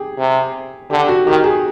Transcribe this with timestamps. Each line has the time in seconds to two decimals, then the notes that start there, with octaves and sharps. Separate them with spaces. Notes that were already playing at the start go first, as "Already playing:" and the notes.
Already playing: G4 G#4
0.19 C3
0.91 D3 G4
1.08 F#4
1.27 D#3 G4
1.44 G#4